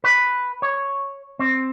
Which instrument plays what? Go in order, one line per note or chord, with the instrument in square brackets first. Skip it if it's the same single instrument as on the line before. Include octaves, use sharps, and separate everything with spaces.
[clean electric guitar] B4
C#5
C4